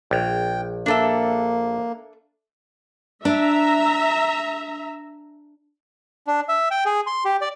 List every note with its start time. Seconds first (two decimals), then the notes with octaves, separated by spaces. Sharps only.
0.11 A#1 G5
0.86 A#3 D4 A4 E5
3.25 D4 E5 A#5
6.27 D4
6.49 E5
6.71 G5
6.86 G#4
7.07 C6
7.25 G4
7.41 D5